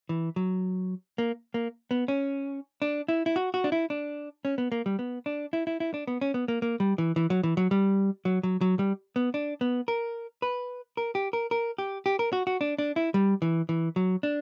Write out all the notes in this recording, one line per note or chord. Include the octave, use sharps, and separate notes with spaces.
E3
F#3
A#3
A#3
B3
C#4
D4
E4
E4
F#4
F#4
D4
E4
D4
C#4
B3
A#3
G3
B3
D4
E4
E4
E4
D4
B3
C#4
B3
A#3
A#3
G3
E3
E3
F#3
E3
F#3
G3
F#3
F#3
F#3
G3
B3
D4
B3
A#4
B4
A#4
G4
A#4
A#4
G4
G4
A#4
F#4
F#4
D4
D4
E4
G3
E3
E3
F#3
D4